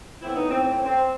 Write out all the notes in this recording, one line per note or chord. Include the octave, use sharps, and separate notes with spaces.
A2 E3 B3 C4 E4
B3 D#4
C4
C4
C4